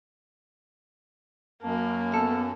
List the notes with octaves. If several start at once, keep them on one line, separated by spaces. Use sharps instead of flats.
F#2 A#3 A5
B3 A4